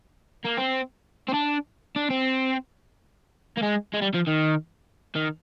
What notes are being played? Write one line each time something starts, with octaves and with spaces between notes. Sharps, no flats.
A#3
C4
C4
D4
D4
C4
A#3
G#3
G#3
G3
F3
D#3
D#3